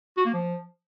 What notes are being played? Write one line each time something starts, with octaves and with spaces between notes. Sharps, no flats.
F#4
A#3
F3